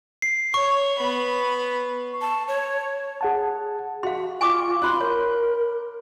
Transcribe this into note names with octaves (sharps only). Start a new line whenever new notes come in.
C7
C#5 C#6
B3 B5
A5
C#5
G#4 F#5 A5
F#4 F5 C6
F4 G#5 C#6 D6
B5 C6 F#6
A#4 C#5